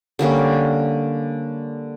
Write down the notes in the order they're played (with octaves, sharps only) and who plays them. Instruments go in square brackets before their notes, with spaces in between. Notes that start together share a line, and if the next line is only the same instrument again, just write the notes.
[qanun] D3 G3 A#3 C#4